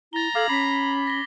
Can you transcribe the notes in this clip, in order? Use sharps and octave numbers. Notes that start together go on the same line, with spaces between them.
E4 A#5 A6 G7
A4 F5 D6 G#6 F#7
C#4 B5 B6 C7
A#6 G7